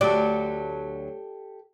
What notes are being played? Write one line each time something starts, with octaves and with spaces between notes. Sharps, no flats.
D2 F#3 G4 A4 D5